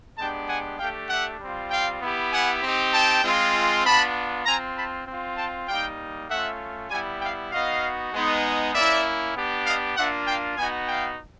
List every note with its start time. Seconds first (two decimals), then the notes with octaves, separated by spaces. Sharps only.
0.18 G#3 B3 D4 G4 G5 A5
0.48 F#5 G#5
0.79 A3 D4 G4 F5 G5
1.10 E5 F#5
1.41 G3 C4 F4
1.71 F5 G5
2.02 B3 E4 G4
2.32 F#5 G#5
2.62 C4 D#4 G4
2.94 G5 A5
3.24 G#3 C4 F4
3.85 B3 D4 F4 A5 B5
4.46 C4 F4 G#5 A#5
4.77 A5 B5
5.07 C4 F4
5.38 G5 A5
5.69 G3 A#3 D#4 F5 G5
6.30 A3 C#4 F4 E5 F#5
6.91 G3 B3 E4 F#5 G#5
7.21 F5 G5
7.52 B3 D#4 F#4 D#5 F5
8.14 G#3 B3 D#4
8.75 A#3 C#4 E4 D5 E5
9.36 B3 D4 G4
9.67 D#5 F5
9.97 A#3 D4 F4 E5 F#5
10.28 F5 G5
10.58 B3 D#4 F#4 F#5 G#5
10.88 F5 G5